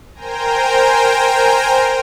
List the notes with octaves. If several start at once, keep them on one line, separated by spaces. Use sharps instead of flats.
A#4 C5 G5 G#5 A#5